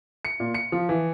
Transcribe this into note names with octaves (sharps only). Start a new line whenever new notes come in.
C#7
A#2
C#7
F3
E3